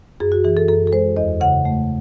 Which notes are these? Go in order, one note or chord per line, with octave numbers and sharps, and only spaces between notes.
F#2 G#4
F#4
E3 G#4
A4
F#2 A4
A4
G#3 C5
E2 D#5
C#3 F#5
A3